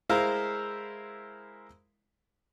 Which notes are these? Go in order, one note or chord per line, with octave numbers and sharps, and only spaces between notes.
G#3 E4 A#4 C5 F5